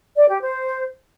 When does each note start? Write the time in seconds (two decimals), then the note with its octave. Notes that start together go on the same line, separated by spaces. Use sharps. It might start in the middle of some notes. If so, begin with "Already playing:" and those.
0.16 D5
0.28 G4
0.40 C5